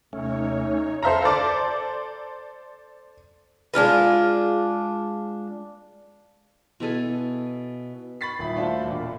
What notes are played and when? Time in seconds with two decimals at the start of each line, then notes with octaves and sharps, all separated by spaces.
0.13 D#2 C3 A3 C#4 D#4 C#5
1.02 A4 C5 E5 F5 A#5
1.22 A4 C5 D5 D6
3.74 G#3 D4 F4 B4
6.80 B2 E4 A4 G#5
8.21 B5 C#6 A6 B6 C7
8.39 D#1 E4 B5
8.56 A3 D4 F4 F#4 C5 A5
8.84 E1 A#2